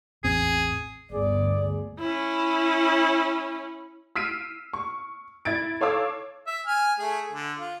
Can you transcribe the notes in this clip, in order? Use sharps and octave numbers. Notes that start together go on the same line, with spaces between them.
A1 E2 C4 G#4
G1 D2 G#4 D5
C#4 E4
E6 F6 B6 C7 D7 D#7
C#6
E4 G#6 A6 D7
A4 C#5 F5 D6 E6
E5
G#5 F6
A3 G#4
D3
F4